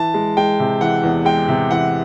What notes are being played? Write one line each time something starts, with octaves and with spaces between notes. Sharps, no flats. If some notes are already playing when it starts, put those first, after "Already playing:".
Already playing: E3 A5
G#3
G#3 G5
C3
E3 F#5
E2
G#3 G5
C3
E3 F#5